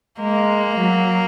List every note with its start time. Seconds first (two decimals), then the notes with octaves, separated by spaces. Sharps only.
0.20 G#3 A#3
0.79 F#3